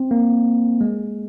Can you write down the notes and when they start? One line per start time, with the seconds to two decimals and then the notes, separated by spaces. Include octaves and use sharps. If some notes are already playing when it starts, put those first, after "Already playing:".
Already playing: C4
0.11 A#3
0.81 G#3